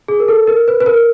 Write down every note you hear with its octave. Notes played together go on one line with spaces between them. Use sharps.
G#4
A#4
A4
A#4
B4
B4
A#4